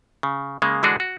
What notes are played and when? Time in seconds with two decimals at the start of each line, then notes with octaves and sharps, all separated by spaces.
0.23 C#3
0.62 C#3 G#3 A#3
0.83 D3 E3 G#3 D4 F#4 G#4
1.00 F#4